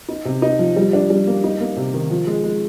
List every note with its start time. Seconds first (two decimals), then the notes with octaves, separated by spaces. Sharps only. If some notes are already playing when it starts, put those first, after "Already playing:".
0.09 D#4
0.25 C3
0.42 D#4
0.59 F3
0.76 G3
0.93 D4
1.10 G3
1.27 A#3
1.44 D#4
1.60 A#3
1.77 C3
1.94 D#3
2.10 F3
2.27 G#3
2.44 G#3